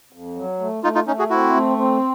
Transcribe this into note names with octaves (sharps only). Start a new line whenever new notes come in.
F2
F#3
A3
A3 D#4 F4
D#4 F4
A3 C#4 D#4
F#4 G#4
C4 E4 F#4
A3
C4